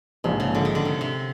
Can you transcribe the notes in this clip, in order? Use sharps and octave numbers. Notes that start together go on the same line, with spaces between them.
A#1 G#2 C3 F3 G#3
C#3
D3
D#3
D3
C3
C3